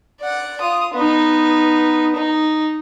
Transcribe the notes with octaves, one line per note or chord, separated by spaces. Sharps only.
D5 F#5
F4 D#6
B3 D#4
D#4